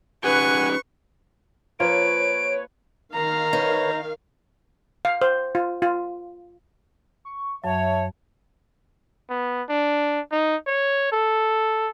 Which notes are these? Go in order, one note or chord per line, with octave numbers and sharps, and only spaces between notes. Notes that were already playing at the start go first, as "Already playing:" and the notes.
C#4 D#4 G4 B4 F#5 G#5 C#6
F3 A#3 F4 B4 C#5 D7
D#3 A#4 F5 A#5
D#4 B4 C#5
F5
C5
F4
F4
C#6
F#2 F#3 C#5 E5 A5
B3
D4
D#4
C#5
A4